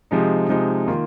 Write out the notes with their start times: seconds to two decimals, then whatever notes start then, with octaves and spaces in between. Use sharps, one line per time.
0.11 C3 F3 G#3 D#4
0.49 C3 F3 G#3 D#4
0.88 D#3 A#3 F4